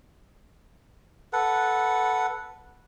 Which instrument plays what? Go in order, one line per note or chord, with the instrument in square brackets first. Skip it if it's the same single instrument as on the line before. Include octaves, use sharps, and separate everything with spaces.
[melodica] A4 B4 F#5